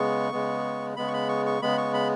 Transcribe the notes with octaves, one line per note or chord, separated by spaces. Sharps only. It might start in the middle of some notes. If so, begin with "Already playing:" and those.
Already playing: C#3 G#3 B3 C#6
C#3 G#3 B3
C#3 G#3 B3 B5
C#6
B5
C#6
C#6
C#3 G#3 B3 B5
C#6
B5